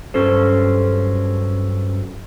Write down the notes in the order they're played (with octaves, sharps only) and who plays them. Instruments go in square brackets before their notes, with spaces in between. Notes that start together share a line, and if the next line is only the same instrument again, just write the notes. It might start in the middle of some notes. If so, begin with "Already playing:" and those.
[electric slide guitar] G2 F#3 C#4 A4 C5